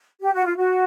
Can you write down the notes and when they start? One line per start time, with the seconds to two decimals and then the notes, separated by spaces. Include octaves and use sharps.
0.22 G4
0.34 F#4
0.45 F4
0.56 F#4